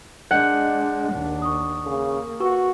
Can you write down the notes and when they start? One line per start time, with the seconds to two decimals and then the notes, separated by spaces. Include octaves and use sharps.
0.31 G#3 D4 D#5 F#5 G6
1.12 D#2 D4
1.42 C#6 D#6
1.86 C#3 A#3
2.40 F#4 B4 C#6